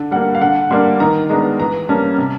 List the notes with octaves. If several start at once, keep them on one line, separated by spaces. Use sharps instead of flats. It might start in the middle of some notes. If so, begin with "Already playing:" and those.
Already playing: D3
G3 A#3 F#5
F5
D3 F#5
G3 A#3 D4 C6
D#3 A#5
G#3 B3 D4 A#5
E3 A#5
G3 A#3 C#4 A5
C3